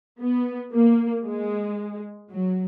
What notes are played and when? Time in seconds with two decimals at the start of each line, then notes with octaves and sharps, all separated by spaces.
0.20 B3
0.73 A#3
1.25 G#3
2.30 F#3